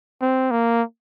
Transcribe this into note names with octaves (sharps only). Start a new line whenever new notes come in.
C4
A#3